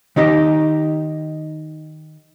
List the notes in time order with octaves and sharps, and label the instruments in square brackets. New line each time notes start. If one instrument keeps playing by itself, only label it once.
[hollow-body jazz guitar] D#3 D#4 G4 D#5